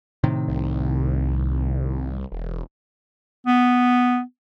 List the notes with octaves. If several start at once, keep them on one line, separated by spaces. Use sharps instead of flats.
A2 C3 D#3
C2
E1
B3